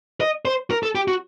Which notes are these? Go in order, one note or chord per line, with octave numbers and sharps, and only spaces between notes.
D#5
C5
A#4
A4
G4
F#4